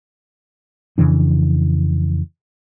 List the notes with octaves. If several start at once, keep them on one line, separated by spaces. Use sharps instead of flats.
F2 C#3 E3 D4